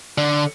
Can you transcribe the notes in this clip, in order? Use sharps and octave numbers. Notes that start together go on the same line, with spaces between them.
D3